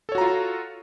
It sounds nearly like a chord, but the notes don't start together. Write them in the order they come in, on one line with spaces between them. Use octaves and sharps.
A4 C#5 F#4 A#5 F4